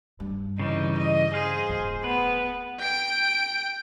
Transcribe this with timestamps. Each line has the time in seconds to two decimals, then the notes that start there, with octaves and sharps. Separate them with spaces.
0.20 G2
0.59 C#3 E3 G3 D#4
0.98 D#5
1.34 G#4 C5 F5
1.69 D1 F4
2.04 B3 B4
2.79 G5 D7